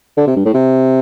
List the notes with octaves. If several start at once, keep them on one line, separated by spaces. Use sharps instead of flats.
D3
C3
G2
A2
C3